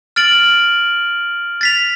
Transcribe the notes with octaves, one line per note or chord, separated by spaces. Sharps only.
F6 A6 D7 F#7
A6 B6 F7